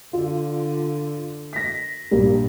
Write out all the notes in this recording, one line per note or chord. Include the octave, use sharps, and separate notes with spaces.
D3 F4
A#6 B6
A#1 G2 G3 A#3